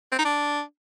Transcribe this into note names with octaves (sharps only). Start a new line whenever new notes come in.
C4
D#4
D4